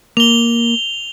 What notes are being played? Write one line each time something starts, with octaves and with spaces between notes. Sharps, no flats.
A#3 F7 G7